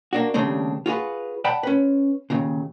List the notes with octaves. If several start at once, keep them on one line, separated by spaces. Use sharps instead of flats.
A#3 D4 F#4
D#2 C#3 G3 A3 C4 D4
F4 F#4 G#4 B4
D5 F#5 G5 A5 B5
C#4 B4
D#2 A#2 C#3